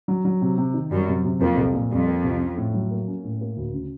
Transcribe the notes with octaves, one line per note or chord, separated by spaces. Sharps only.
F#3
F#3
C3
C3
D#3
F#2 G3
C3
C3
F2 A#3
C2
A#2
F2 G3
A#3
C2
C#4
A2
F#3
A#3
C#4
A2
A#3
D2
C#3